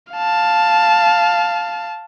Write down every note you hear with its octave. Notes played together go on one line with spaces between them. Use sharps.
F5 A5